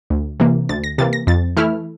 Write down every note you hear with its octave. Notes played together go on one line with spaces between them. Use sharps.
D2
C3 E3 A#3
D2 A6
A#6
C3 E3 A#3 A6
A#6
F2 A6
E3 A3 E4 F6